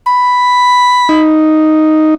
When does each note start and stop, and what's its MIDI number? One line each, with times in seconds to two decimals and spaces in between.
0.07 1.37 83
1.09 2.14 63